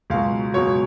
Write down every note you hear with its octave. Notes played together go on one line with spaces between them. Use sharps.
C#2 B2 F#3 F5
C#2 B2 F#3 C#5